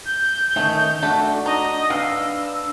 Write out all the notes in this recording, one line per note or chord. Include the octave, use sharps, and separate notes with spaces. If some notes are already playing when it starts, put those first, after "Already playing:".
G6
D#3 A3 C#4 D#4
A3 D4 F#4 A4
D#4 D#5
D4 B4 F5 E6